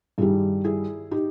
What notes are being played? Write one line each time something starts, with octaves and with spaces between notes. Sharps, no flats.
G2 D#3 G3 E4 G#4
E4 G#4
D#4 G4